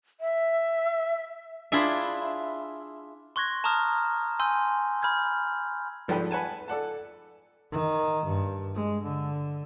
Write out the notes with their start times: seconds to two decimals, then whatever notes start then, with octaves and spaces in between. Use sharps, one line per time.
0.21 E5
1.72 D4 E4 F4 G#4 D5 E5
3.36 C6 C#6 F#6 G#6 A#6
3.64 A5 A#5 C#6 D#6 F6
4.39 G#5 C6 E6 G6
5.02 B5 F6 G6 G#6
6.08 G#1 F3 G3 A4 B4 G5
6.31 B4 F#5 G#5 A5
6.68 A4 D5 F#5 A5
7.72 D#3
8.26 G2
8.75 G#3
9.03 D3